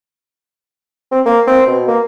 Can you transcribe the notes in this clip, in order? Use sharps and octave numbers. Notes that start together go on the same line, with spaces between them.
C4
A#3
C4
B2
A#3